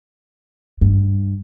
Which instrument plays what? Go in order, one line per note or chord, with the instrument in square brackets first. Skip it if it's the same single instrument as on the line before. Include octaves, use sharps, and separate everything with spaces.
[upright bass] G2